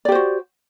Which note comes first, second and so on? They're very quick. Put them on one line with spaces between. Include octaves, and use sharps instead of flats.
D5 G4 C5 F#4